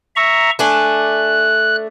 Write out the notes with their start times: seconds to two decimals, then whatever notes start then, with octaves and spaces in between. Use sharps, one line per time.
0.16 E5 A#5 C#6
0.59 A3 D4 G#5 F#6